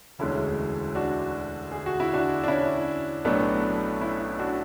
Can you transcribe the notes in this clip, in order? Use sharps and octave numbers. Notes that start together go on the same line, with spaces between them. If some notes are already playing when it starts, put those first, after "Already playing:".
E1 D2 D3 G#3 C#4 E4
D4 F#4
G#4
F#4
E4
D4 F#4
D4
C#4 E4
B1 A2 F#3 A3 B3 D4
C#4 E4
D4 F#4